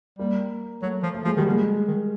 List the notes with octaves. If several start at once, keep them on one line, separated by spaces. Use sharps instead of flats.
G3 A#3
F#3 A3
F3
A3
F3 G#3
D#3 G3
D3
G#3
D#3